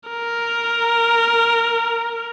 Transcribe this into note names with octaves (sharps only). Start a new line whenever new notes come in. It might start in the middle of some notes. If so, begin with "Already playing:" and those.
A#4